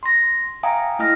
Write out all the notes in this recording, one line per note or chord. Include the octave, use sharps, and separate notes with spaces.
C6 A#6
E5 F5 G5 G#5 A#5 D#6
A3 E4 E5 D#6 F6 A#6